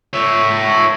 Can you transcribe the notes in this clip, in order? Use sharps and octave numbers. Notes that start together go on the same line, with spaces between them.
C#5 E5